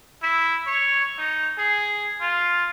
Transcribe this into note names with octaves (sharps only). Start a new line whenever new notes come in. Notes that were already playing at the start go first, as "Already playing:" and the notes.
E4
C#5
D#4
G#4
F4